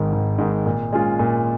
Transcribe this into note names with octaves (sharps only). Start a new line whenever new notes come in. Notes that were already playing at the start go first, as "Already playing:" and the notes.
Already playing: G#1 G#2 D#3
G#1
G#2 D#3
A#2
G#3 C#4 F4
A#2